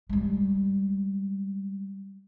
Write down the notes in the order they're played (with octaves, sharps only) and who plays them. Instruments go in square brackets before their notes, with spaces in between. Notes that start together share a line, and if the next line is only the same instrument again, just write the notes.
[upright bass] G3 G#3